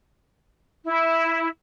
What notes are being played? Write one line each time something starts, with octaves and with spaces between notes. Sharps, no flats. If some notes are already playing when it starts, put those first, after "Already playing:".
E4